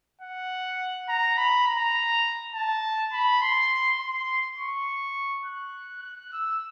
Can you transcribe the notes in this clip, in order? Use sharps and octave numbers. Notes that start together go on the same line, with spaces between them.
F#5
A#5
B5
A#5
A5
B5
C6
C6
C#6
F#6
F#6
E6